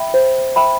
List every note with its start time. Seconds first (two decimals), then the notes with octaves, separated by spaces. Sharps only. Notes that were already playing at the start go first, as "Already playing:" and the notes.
Already playing: E5 G5 B5
0.14 C5
0.56 E5 G5 B5